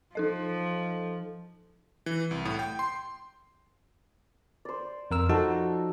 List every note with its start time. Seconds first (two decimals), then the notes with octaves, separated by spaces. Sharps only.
0.15 F3 D#4 A4 D#5
2.06 E3
2.31 C2
2.45 A2
2.59 G5
2.79 C6
4.65 C5 D5
5.11 F2 A#4 E6
5.29 F3 D#4 F#4 A4